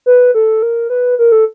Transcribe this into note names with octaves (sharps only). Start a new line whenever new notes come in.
B4
A4
A#4
B4
A#4
A4